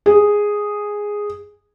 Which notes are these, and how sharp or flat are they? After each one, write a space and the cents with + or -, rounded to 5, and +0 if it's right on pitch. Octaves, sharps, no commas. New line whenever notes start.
G#4 -5